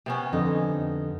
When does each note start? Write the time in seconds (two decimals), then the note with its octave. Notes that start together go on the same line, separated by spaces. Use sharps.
0.06 C3 B3 C#4
0.33 F2 D3 D#4